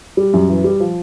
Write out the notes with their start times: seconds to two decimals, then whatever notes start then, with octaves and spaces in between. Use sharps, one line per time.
0.17 G3
0.34 F#2
0.48 E3
0.64 G3
0.80 F3